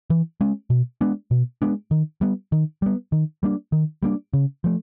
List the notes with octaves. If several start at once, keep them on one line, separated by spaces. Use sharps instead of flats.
E3
G#3 C#4
B2
G#3 B3 D4
B2
G#3 B3 D4
D#3
G3 B3
D#3
G3 B3
D#3
G3 A#3 D4
D#3
G3 A#3 D4
C#3
F3 A3